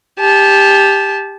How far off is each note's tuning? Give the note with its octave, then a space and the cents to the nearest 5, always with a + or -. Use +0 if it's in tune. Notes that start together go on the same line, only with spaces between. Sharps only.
G4 +15 A5 -20